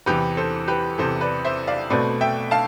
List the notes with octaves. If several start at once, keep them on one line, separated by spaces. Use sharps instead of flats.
E2 C3 E3 G4 B4
A4 C5
G4 B4
E2 C3 E3 A4 C5
B4 D5
C5 E5
D5 F5
B2 A3 C4 B4 D5
E5 G5
F5 A5